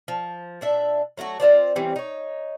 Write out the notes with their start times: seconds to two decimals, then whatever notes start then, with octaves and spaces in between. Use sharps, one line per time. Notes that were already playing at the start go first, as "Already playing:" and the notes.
0.08 F3
0.61 A#2 D4 E5
1.17 F#3 A3 F4 F#4
1.40 C4 F4 C5 D5
1.76 E3 G3 C4 C#4
1.96 D#4 C#5